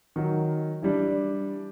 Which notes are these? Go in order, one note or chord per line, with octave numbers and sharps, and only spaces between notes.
D#3 F#3
E3 G3 D4